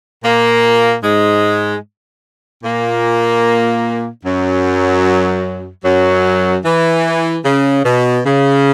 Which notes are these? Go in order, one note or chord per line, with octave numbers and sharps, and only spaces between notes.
A#2 A#3
G#2 G#3
A#2 A#3
F#2 F#3
F#2 F#3
E3
C#3
B2
C#3